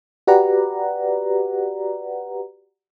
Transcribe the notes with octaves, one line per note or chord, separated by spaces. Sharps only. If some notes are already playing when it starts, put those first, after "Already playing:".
F#4 G4 B4 D5 F#5 A#5